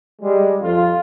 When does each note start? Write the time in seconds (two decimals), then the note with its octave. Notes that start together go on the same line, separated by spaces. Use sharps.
0.22 G3 G#3
0.61 F2 F4